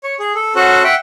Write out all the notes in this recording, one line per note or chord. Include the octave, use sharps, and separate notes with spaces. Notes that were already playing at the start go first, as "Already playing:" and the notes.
C#5
G#4
A4
C#4 F#4 A4 C5 F#5
E5 F#5 G5